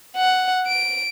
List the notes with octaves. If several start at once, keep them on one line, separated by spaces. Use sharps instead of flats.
F#5
D7